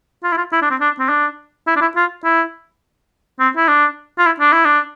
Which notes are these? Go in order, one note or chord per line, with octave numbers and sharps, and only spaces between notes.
F4
E4
F4
E4
D4
C4
D4
C4
D4
E4
D4
E4
F4
E4
C4
E4
D4
F4
E4
D4
E4
D4